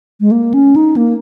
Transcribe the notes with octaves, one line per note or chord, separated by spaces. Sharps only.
G#3
A#3
C#4
D#4
A#3